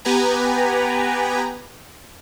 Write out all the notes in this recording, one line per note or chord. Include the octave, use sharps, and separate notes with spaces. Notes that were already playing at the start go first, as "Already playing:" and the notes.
B3 G4 B4 G#5 A#5